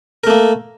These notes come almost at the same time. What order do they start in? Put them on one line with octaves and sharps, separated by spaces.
A#4 A3 A#3